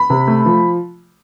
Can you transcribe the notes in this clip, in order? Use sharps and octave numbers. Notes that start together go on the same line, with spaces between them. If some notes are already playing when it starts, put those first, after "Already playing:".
Already playing: B5
C3
A3
F3